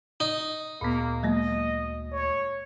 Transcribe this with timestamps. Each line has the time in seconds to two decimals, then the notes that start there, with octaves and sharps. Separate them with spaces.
0.20 D#4
0.81 D2 A#2 A#3 B3
1.23 F#3 G#3 A#3 D#5
2.12 C#5